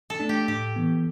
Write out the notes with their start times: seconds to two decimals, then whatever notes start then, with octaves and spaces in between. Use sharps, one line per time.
0.10 A4
0.20 A3 D4
0.29 G4
0.48 A2 G4
0.76 E3 B3